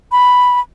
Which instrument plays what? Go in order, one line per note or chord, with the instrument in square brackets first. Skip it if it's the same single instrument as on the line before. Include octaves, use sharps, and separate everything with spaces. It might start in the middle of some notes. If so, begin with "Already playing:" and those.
[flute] B5